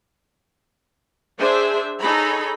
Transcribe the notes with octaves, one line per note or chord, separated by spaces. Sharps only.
D4 G#4 C5 E5
D#4 G#4 A4 C#5 B5